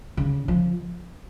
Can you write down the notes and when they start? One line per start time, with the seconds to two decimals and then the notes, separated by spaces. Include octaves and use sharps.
0.17 C#3
0.48 F3